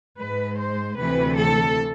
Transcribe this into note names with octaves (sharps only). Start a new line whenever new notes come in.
G#2 G#3 B4
C5
D2 C3 E3 A3 B4
A4